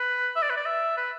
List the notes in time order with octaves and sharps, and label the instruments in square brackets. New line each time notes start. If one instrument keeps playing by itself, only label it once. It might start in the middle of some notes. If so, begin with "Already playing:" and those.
Already playing: [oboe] B4
E5
D5
B4
D5
E5
B4